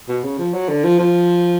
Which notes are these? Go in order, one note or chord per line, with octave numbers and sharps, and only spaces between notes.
B2
C#3
F3
F#3
D3
F3
F3